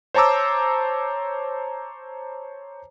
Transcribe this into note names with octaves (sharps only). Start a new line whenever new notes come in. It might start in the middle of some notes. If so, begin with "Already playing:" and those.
C5 C#5 A5 A#5 D6 E6